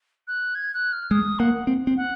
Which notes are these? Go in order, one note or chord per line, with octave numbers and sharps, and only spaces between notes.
F#6
G#6
F#6
F6
G#3 D#6
A#3 F#5
C4
C4
F#5